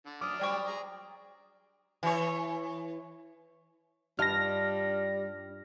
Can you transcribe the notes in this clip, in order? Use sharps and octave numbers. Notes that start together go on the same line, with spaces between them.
D3
F#2 D4 D6 D#6 F6
F#3 G3 C5 D5 G5 C#6
G#4 A#5
E3 C#5
G2 G3 D4 D#4 F4 F6 A#6